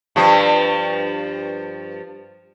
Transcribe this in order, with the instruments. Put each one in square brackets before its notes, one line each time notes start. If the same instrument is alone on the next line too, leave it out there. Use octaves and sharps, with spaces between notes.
[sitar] G2 F3